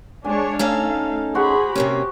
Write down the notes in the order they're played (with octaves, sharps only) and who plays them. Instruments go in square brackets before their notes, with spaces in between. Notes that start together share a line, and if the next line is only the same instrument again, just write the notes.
[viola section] G#3 D4 C#5 [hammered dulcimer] G#5
[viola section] A3 F5 [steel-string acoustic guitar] C#4 D#4 A4 [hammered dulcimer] G#5
[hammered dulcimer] F#4 C5 [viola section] G#4 B5
[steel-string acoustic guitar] C3 A#3 C#4 [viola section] G4